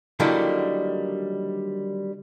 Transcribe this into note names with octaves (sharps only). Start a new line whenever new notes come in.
D3 D#3 F#3 G3 A#3 E4